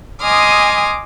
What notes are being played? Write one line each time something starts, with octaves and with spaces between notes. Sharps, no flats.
D#5 G#5 C6 D6 D#6 F6